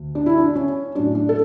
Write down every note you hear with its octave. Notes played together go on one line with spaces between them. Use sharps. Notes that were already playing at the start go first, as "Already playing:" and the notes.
Already playing: D2
D4
E4
D4
C#4
A2 F#3 D4
D4
A4